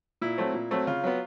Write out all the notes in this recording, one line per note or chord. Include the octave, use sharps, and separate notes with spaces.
A#2 E4
F#3 A3 C4
A#2
F#3 A3 C4
C#3 F4
F#3 B3